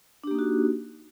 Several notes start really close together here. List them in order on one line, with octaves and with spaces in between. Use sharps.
D4 G4 A#3 D#4 F#4